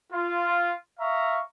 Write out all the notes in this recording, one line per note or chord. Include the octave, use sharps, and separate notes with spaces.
F4
E5 F5 A#5 C#6